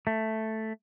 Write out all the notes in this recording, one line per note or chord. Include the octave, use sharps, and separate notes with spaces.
A3